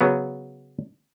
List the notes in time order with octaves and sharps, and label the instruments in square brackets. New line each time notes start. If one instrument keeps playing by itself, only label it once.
[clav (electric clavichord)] C#3 F#3 B3